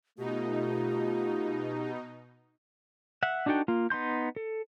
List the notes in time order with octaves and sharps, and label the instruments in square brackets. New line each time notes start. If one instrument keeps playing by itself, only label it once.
[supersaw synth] B2 D#4 [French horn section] A3 F4 [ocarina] G4
[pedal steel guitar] E5 F#5
D4 D#4 F#4 A4 G5
A#3 F4
B3 D#4 C6 G6
A4